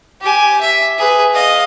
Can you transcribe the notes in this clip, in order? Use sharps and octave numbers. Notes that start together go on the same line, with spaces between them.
G4 G#5
E5
G#4 B4
D#5 F5